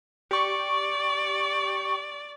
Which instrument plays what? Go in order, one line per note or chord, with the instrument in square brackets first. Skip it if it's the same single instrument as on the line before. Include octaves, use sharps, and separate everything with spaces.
[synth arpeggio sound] G4 C#6 [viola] D5